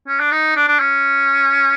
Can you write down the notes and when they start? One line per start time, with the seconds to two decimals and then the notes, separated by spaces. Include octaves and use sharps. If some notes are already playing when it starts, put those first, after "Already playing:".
0.08 C#4
0.20 D4
0.31 D#4
0.56 D4
0.68 D4
0.79 C#4